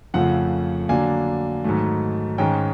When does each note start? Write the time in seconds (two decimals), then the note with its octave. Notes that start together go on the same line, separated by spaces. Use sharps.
0.14 F2 C#3 F3 A3 F#5
0.89 D3 F#3 A#3 D4 G#5
1.64 G#2 D#3 F#3 A3
2.38 G#2 D#3 G#3 C#4 G5